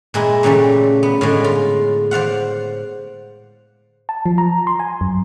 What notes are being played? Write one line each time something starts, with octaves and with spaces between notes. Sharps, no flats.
A#2 G#3 E4
A#2 C#3 E3 G3 A3
B3
A2 D3 G#3
F4
C5 D5 F5 F#5
A5
F3
A#5
C6
G#5
F#2